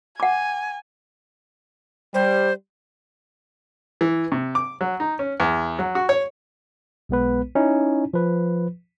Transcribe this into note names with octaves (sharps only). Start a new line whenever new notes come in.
F#5 G#5 D6
G3 C5
E3
C3
D6
F#3
D#4
C#4
E2
F#3
F#4
C#5
B1 G#3 B3 B4
C#4 D#4 E4
F3 B4